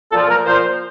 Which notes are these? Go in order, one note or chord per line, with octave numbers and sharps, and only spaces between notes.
A#2 F3 A4
A#4
A#2 F3 C5